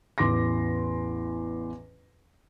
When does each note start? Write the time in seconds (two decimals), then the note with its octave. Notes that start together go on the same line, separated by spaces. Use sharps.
0.18 A1 E2 C6 D6 A#6